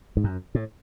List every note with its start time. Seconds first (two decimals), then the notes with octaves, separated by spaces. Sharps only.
0.17 G#2
0.24 F#2
0.55 A2